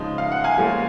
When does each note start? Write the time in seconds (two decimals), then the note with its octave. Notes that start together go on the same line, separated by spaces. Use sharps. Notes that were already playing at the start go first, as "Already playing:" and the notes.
Already playing: C#3 F3 G#3 D#4
0.18 F5
0.32 F#5
0.44 F5 G#5
0.57 A#2 F3 G#3 C#4